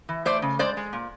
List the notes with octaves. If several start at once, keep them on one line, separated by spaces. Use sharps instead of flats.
E3
A3 C5 D5
C#3
G#3 C5 D5
G#3
A#2